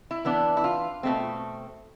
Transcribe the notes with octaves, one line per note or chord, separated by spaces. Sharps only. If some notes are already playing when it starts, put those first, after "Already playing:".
E4
E3 B3 D4
E4
F4
B2 A3 C4